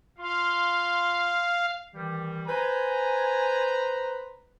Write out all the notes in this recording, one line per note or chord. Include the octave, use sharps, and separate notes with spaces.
F4 F5 C6
D#3 E3 G3
B4 C5 G#5 A#5